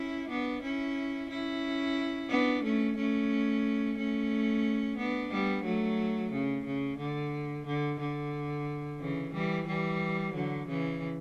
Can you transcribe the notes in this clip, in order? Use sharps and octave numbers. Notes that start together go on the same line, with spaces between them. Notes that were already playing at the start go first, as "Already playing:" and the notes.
Already playing: C#4 E4
B3 D4
C#4 E4
C#4 E4
B3 D4
A3 C#4
A3 C#4
A3 C#4
B3 D4
G3 B3
F#3 A3
C#3
C#3
D3
D3
D3
C#3 E3
E3 G3
E3 G3
D3 F#3
C#3 E3